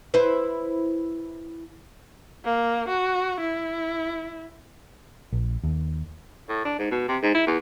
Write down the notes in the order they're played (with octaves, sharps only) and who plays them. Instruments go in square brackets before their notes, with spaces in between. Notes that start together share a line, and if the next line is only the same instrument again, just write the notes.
[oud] E4 B4 C5
[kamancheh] A#3
F#4
E4
[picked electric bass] A#1
D#2
[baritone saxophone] A2
D4
G#2
B2
C3
G#2
E4
E2